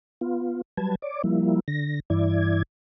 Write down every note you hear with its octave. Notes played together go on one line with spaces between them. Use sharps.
B3 F4
F#3 G3 B4 A5 G#6
C#5 D5 D6
F3 G3 A#3 E4
D3 A#6
G2 E3 E4 D5 G#6